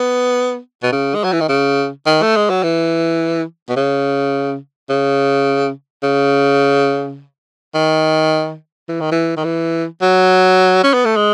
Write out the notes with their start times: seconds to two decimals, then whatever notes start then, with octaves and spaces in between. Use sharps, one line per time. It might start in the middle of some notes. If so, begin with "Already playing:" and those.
Already playing: B3
0.83 B2
0.92 C#3
1.15 G#3
1.24 F#3
1.33 E3
1.41 D#3
1.49 C#3
2.06 D#3
2.22 A3
2.36 G#3
2.50 F#3
2.63 E3
3.69 B2
3.77 C#3
4.90 C#3
6.03 C#3
7.75 D#3
8.89 E3
9.01 D#3
9.12 E3
9.37 D#3
9.45 E3
10.02 F#3
10.84 C#4
10.94 B3
11.05 A3
11.16 G#3